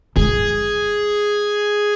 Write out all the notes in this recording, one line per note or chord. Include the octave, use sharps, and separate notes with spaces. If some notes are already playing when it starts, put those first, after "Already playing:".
G#3 G#4